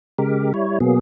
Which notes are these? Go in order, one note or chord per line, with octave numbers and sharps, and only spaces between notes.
C#3 G#3 G4 A#4
G3 E4 C#5
B2 F#3 A#3 B3 G#4